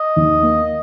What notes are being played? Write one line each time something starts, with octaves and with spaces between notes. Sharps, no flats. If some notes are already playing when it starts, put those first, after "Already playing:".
Already playing: D#5
D#2
A#3